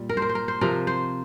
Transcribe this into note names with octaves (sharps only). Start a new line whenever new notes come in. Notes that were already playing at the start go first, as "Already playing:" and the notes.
Already playing: A#2 G3
A#4
C5
A#4
C5
A#4
C5
C3 F3 A#4
C5